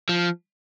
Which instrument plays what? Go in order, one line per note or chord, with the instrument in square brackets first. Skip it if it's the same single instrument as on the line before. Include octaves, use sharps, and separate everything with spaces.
[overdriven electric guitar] F3